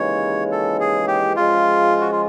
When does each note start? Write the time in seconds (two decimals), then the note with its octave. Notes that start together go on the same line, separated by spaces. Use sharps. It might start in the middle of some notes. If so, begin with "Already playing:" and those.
Already playing: D#2 C#3 E3 G#3 C#5
0.52 A4
0.80 G#4
1.07 G4
1.36 C#3 F3 G#3 F4
2.01 F#4
2.12 F4